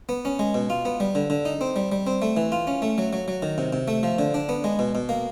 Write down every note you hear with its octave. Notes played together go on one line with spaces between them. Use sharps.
B3
C#4
G#3
B2
F4
B3
G3
D3
D3
D#4
C4
G3
G3
C4
A3
E3
F4
C#4
A3
F#3
F#3
F#3
D#3
C3
C3
A3
F3
D3
D4
B3
G#3
B2
B2
A#3